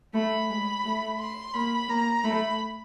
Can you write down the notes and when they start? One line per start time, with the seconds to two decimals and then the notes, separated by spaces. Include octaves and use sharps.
0.14 A3 B5
0.49 G#3
0.84 A3
1.19 C6
1.53 A#3 B5
1.88 A#3 A#5
2.24 A3 B5